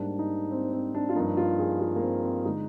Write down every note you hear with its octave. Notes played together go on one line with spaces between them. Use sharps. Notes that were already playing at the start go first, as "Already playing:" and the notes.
Already playing: G#2 G3 A#3 D4
D#4
C4
C4
D4
F4
G2 F3 A#3 D#4
F4
G#4
F4
A#3
C4
C4
D3 G#3 D#4